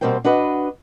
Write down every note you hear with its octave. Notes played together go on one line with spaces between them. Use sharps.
B2 G3 A#3 C4 C5 G5
D4 F#4 B4 D#5